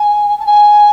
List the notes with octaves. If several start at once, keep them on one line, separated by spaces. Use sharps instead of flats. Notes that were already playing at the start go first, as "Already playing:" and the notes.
Already playing: G#5
A5
G#5